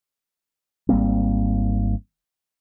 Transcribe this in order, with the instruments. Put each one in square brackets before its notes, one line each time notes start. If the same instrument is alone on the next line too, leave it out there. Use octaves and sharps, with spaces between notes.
[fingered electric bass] G#1 G3 A#3 C4